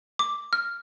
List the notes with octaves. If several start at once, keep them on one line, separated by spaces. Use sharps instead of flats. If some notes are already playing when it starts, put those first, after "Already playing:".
D6
F6